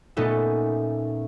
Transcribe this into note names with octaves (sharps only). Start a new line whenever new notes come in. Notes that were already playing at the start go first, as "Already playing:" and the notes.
A#2 A3 B3 C#4 D#4 A4